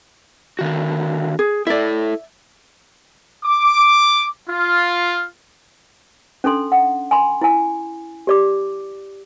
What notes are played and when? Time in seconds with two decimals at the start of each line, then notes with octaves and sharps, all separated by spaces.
0.59 D3 D#3 F#4
1.39 G#4
1.67 E4 A4 D5 E5
3.45 D6
4.50 F4
6.44 C#4 D4 A4 C6
6.72 F#5
7.11 G#5 B5 C6
7.41 E4 G#5
8.27 G4 D5 D6